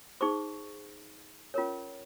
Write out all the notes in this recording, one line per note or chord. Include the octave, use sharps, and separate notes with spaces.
D#4 G#4 C5 C#6
C#4 F4 A#4 C#5